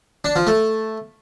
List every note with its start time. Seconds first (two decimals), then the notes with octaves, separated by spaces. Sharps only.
0.25 D4
0.36 F3
0.47 A3